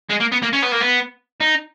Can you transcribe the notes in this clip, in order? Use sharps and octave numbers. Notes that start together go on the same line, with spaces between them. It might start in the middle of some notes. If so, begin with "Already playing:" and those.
G#3
A#3
B3
A#3
C#4
B3
A#3
B3
D#4